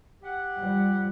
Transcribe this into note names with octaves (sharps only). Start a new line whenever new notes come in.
G4 F#5
F3 G3